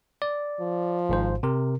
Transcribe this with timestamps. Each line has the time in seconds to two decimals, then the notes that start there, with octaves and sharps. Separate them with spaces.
0.22 D5
0.60 F3
1.09 G#1 G#2 C5
1.43 C3 A#4